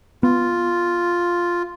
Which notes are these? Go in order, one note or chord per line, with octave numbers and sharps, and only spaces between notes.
B3 F4